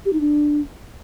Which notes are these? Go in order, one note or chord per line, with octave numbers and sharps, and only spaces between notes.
G4
D#4
D4